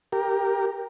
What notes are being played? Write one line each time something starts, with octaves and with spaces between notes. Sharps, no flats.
G4 A#4